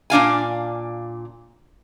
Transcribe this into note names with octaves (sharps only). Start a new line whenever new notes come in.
A#2 D4 F5 G#5